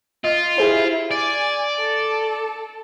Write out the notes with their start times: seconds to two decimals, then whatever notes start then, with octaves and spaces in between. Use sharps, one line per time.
0.24 F4 D#5
0.58 E4 G4 G#4 C5
1.11 D5 G#5
1.80 A4